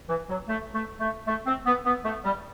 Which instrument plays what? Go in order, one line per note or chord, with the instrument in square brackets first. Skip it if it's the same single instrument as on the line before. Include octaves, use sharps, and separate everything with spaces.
[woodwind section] E3
F#3
A3
A3
A3
A3
C4
B3
B3
A3
G3